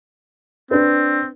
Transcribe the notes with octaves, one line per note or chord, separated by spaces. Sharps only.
C4 D4 B4